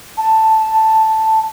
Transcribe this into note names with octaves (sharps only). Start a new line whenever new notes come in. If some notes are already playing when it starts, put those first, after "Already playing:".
A5